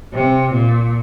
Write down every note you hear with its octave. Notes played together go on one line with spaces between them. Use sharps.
C3
A#2